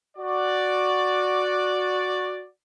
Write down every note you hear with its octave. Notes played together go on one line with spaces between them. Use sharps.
F#4 D5